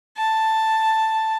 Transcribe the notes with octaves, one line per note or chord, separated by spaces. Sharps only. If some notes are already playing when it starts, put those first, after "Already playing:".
A5